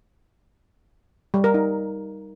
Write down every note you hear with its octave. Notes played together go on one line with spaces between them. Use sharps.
G3
A#4
D#4